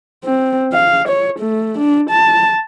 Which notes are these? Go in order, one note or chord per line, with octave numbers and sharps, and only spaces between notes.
C4
F5
C#5
A3
D4
A5